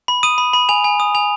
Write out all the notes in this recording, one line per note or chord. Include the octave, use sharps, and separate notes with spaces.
B5
D#6 D#7
B5
B5
G#5 F7
G#5
D#6
G#5 F7